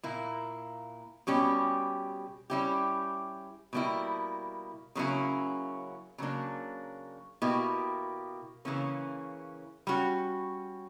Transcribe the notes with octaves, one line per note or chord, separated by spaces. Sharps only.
A#2 A#3 E4
B2 G3 C#4 G4
G3 C#4 E4 G4
B2 G3 A#3 E4
C#3 F#3 A#3 C#4 E4
C#3 F#3 A#3 D4
B2 A#3 E4 G4
C#3 E3 A#3 C#4
G3 C#4 F#4